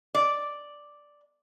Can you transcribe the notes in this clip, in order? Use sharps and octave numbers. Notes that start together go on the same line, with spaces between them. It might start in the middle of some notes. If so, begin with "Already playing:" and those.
D5